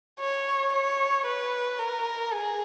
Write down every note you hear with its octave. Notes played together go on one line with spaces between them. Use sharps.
C#5
C#5
B4
A#4
G#4